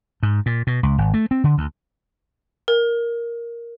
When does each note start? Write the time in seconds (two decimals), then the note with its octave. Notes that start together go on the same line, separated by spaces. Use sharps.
0.23 G#2
0.46 A#2
0.67 B2
0.83 C#2
0.98 G#1
1.14 A3
1.31 C4
1.44 D3
1.58 D2
2.68 A#4